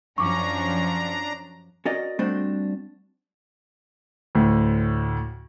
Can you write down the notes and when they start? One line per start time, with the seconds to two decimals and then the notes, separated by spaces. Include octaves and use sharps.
0.18 F#2 F3 C#4 D4 A#5 C#6 D6
1.85 C#4 F#4 A#4 D5 D#5
2.19 G3 A3 C4 D4 F#4 C5
4.35 D2 A2